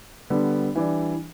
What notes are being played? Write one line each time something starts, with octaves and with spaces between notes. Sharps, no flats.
D3 G3 B3
E3 G3 D4